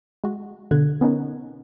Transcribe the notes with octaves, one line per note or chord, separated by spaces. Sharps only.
G#3 F#4
B2 D3 F#6 G#6
B3 C#4 D#4 A#4